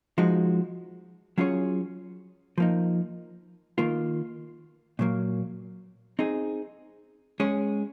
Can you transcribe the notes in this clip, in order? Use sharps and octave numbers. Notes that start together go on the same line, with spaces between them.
F3 G#3 D#4 F#4
F#3 C#4 F4 G#4 C#5
F3 A#3 D#4
D#3 A#3 F4
A#2 F#3 A#3
C4 D#4 G#4
G#3 C#4 G#4 C#5